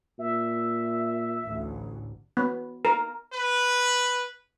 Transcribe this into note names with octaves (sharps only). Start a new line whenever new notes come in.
A#2 E5
A1 D2
B3
A#4
B4